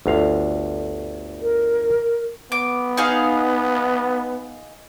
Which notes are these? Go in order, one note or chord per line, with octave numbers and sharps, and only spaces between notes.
G1 D2 F5
A#4
B3 D6
D#4 G#4 F5